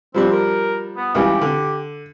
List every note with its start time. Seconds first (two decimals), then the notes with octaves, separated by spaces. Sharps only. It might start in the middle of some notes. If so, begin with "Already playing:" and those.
0.14 F3 G3 C4 D4
0.32 A#4
0.97 B3
1.15 C#2 E3 G3 G4
1.41 D3